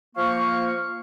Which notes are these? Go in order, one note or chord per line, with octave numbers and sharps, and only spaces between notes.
F3 A#3 F5 C#6